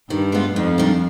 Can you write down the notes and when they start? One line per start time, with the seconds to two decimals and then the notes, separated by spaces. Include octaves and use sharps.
0.10 G2 D#3
0.32 G#3 B3 F4
0.55 F2 G#2
0.78 D#3 G3 D4